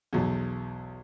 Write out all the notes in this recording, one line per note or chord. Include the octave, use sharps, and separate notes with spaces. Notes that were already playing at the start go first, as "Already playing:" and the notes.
B1 E2